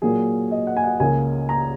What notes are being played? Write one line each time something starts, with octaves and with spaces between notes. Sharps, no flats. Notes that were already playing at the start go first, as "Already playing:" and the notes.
A#2 F#3 A#3 G#4
D#5
F#5
G#5
F#5
C#2 C#3 A#3 G#5
A#5